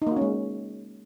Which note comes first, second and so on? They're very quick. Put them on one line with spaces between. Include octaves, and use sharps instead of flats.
D#4 A#3 F#4 C#4 G#3